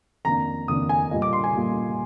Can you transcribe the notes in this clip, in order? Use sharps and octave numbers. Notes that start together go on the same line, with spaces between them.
F2 D#3 A#3 D4 A#5
F2 D#3 A#3 D4 D#6
G#5
A#2 G3 A#3 F4 D#5
D6
C6
G#5
A#2 G3 A#3 F4